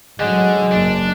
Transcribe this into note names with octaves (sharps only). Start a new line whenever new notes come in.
A1 D3 F#3 G#3
F#1 D4